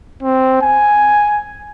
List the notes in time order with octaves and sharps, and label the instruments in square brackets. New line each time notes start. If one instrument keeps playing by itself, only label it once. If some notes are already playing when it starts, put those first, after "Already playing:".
[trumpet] C4
G#5